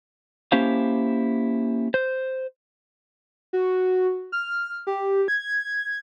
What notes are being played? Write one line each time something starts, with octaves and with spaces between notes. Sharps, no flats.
A#3 C#4 E4 G4 C5 F5
C5
F#4
F6
G4
G#6